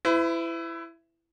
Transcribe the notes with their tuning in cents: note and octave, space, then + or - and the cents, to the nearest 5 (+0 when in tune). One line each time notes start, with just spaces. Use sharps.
E4 +15 B4 +45